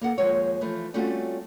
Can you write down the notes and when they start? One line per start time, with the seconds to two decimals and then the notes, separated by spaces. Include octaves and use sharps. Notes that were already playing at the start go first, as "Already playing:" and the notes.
0.01 A#3 A4 F#5
0.18 D#2 F3 G#3 C#5
0.61 E3 F3 A3
0.94 G3 A3 C4 C#4 F4 F#4